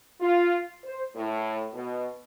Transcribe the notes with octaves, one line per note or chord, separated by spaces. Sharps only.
F4
C5
A2
B2